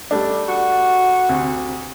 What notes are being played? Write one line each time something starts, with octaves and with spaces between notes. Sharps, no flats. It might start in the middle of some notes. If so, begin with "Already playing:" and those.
G3 A3 D4
F#4
D2 C3